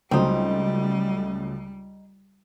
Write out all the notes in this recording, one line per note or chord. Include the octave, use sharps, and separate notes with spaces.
C#2 F#3 G3 A3 C4 D#4